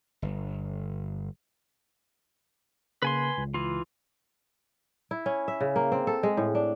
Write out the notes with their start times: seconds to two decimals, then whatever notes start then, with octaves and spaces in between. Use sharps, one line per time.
0.22 G1
3.02 C#3 A#3 B4 G#5 C6
3.38 C#2
3.54 E3 F4
5.11 E4
5.26 C#4
5.48 E5
5.61 C#3
5.76 A#3
5.92 C4
6.07 A4
6.23 G#3
6.37 A2
6.55 D4